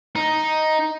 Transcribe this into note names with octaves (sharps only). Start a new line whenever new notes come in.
D#4